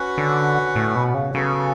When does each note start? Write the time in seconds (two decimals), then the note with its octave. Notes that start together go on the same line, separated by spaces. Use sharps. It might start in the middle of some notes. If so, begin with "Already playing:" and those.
Already playing: C#4 F#4 B4 F#5
0.18 D3
0.76 A2
0.96 B2
1.14 C#3
1.34 C#3 F#3 B3 F#4 A4